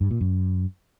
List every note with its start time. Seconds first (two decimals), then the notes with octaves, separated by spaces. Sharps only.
0.01 G2
0.11 A#2
0.21 F#2